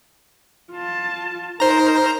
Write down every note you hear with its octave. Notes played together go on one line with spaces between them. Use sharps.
F4 A5
D#4 A#4 C5 A#5